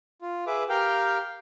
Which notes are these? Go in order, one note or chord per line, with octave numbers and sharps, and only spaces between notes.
F4
G#4 B4 E5 D6
G4 A#4 F5 G5